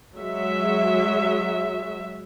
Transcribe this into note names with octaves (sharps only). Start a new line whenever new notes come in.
F#3 G#3 E5